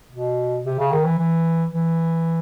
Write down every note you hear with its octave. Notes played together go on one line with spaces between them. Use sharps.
B2
C3
C#3
D#3
E3
E3
E3